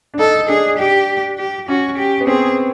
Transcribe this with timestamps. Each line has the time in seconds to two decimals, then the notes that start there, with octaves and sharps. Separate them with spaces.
0.14 D4
0.19 D#4 A4
0.49 D4 G#4
0.78 G4
1.38 G4
1.68 C#4 F#4
1.98 G4
2.21 B3
2.27 C4 G#4